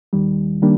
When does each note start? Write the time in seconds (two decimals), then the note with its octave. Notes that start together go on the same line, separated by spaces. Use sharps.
0.13 D#2 D#3 G3
0.62 D#3 G3 A#3 D4